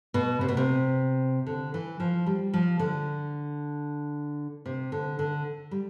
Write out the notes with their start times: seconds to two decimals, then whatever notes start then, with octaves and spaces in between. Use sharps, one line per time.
0.14 B2
0.41 C3
0.48 B2
0.57 C3
1.47 D3
1.74 E3
2.00 F3
2.26 G3
2.54 F3
2.79 D3
4.66 C3
4.92 D3
5.19 D3
5.71 G3